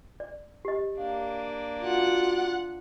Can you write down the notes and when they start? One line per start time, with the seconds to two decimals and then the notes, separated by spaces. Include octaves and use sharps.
0.20 D5
0.65 G4 D#5
0.97 A#3 D4 F5
1.83 F4 F#4 F#5